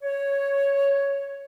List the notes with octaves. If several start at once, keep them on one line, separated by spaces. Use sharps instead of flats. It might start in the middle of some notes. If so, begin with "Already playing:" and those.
C#5